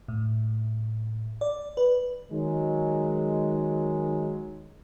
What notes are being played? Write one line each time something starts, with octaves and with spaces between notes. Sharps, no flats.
A2
D5
B4
D#3 F#3 G#3